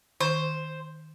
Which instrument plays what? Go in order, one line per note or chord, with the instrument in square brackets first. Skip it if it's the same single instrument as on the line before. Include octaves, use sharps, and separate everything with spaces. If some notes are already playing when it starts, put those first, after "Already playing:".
[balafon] D#3 [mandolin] C5